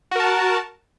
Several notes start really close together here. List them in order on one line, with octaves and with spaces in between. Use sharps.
F#4 A#4 A5